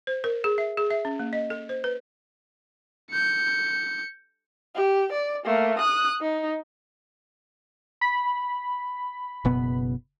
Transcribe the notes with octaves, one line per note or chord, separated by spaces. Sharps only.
C5
A#4
G#4
E5
G#4
E5
C#4
A#3
D#5
A4
C5
B4
G6 C#7
G4
D5
A3 A#3
D#6 F#6
D#4
B5
F#1 B2 B3